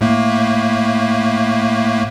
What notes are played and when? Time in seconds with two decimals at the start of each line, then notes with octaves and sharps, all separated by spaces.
0.01 A2 A3 A#3